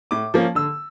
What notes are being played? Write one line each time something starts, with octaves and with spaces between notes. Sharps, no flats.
A2 D6
F3 A#3 C#4
D3 E6